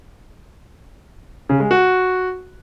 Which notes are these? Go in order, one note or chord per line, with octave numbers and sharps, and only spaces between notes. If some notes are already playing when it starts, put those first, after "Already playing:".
C#3
G#3
F#4